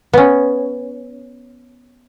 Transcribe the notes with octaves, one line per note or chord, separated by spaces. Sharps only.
B3 C#4